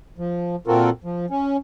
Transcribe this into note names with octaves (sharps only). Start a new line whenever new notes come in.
F3
A#2 C4 F4 F#4 A4 A#4
F3
C#4